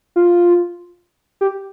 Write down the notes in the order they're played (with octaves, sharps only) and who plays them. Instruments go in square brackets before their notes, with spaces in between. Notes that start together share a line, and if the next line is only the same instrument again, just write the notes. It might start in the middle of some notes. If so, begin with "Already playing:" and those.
[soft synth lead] F4
G4